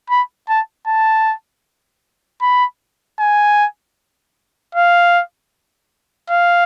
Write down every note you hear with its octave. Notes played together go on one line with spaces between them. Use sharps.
B5
A5
A5
B5
G#5
F5
F5